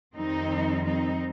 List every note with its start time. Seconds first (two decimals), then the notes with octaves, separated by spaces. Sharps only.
0.15 F2 D#3 G3 C4 D#4
0.86 C4 D#4